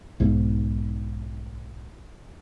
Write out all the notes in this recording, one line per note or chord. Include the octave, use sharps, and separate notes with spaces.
B1 G#2